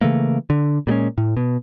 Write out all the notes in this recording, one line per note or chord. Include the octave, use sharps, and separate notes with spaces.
C#3 E3 A3 A#3
D3
A#2 G3 G#3 C#4
A2
B2